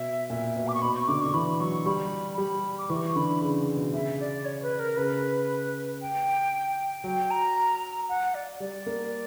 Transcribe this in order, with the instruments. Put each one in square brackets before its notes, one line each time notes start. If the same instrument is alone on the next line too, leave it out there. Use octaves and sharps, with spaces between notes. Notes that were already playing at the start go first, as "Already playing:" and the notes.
Already playing: [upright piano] B2 [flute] E5
[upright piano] A#2 [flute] E5
[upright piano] B2
[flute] D6
C#6
[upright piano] B2 [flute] B5
[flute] C#6
[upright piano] D3 [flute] D6
[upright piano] D3 [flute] C#6
[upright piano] E3 [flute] B5
[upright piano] F#3 [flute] C#6
[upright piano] G3 [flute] B5
[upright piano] G3 [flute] B5
[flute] D6
[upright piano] E3 [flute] C#6
[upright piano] D3 [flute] B5
[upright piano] C#3
B2
[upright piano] C#3 [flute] E5
[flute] D5
C#5
B4
A#4
[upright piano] C#3 [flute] B4
[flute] G5
[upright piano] F#3 [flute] G5
[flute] A#5
F#5
D5
[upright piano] G3 [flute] D5
[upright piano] A#3